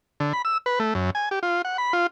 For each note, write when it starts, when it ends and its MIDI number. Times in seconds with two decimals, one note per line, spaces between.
0.20 0.33 50
0.33 0.42 83
0.45 0.58 88
0.66 0.79 71
0.80 0.94 57
0.95 1.10 42
1.15 1.29 80
1.31 1.39 67
1.43 1.62 65
1.65 1.77 78
1.78 1.93 83
1.93 2.07 65